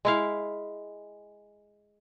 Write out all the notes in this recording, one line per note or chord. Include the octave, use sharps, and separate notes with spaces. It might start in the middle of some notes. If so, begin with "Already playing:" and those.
G#3 E4 F5